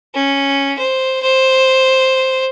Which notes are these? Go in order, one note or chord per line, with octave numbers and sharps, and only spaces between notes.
C#4
C5
C5